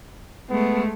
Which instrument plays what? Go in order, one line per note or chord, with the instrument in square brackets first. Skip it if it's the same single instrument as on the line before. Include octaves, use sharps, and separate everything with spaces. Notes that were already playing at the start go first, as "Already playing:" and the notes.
[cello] G#3 A3 [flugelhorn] B3